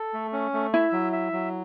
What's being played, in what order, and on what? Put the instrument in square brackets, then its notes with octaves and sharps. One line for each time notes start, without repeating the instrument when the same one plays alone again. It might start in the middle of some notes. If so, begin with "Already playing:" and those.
Already playing: [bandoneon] A4
A3
C#4
A3
[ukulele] E4 [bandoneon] E5
[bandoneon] F#3
E5
F#3